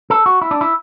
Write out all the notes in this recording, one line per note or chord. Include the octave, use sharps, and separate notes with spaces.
A4
F#4
E4
D4
E4